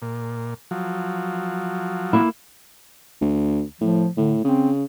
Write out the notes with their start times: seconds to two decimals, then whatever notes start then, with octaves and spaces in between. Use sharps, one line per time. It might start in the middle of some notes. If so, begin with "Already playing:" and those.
0.02 A#2
0.71 F3 F#3
2.13 A#3 E4
3.21 D2
3.81 A2 F3
4.17 A2 D3
4.44 C#3 C4